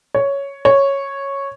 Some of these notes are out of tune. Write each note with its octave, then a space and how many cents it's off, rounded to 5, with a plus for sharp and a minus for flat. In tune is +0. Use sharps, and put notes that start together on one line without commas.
C#5 +5
C#5 -5